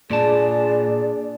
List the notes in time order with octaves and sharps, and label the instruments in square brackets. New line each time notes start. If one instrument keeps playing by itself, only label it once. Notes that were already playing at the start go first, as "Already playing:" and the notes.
[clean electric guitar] A#2 A5 [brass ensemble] D4 G#4 [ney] D5